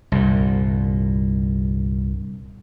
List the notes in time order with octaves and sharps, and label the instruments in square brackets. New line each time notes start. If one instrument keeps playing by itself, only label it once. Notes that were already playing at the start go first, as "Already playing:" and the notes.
[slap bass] C2 G2 A#2